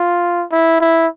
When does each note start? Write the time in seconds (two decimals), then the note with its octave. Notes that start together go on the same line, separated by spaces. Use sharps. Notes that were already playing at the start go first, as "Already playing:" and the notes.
Already playing: F4
0.51 E4
0.81 E4